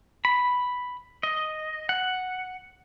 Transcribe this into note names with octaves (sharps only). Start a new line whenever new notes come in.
B5
D#5
F#5